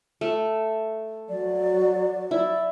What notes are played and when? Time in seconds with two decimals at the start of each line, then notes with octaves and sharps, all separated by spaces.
0.21 A3
1.29 F#3 D5
2.31 E4 D5